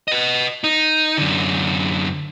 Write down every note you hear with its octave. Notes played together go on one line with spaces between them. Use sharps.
B4 D#5
D#4
F#2 D3